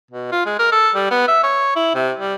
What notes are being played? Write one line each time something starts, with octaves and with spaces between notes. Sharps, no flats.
B2
F4
G#3
A#4
A4
G3
B3
E5
C#5
E4
C3
G3